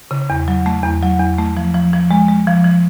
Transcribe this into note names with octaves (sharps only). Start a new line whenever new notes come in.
C#3
E2
F#3
A3
E2
F#3
E2
A3
F3
F3
F3
G#3
G#3
F3
F3